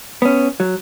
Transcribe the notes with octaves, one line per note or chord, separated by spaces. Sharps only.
B3 C#4
F#3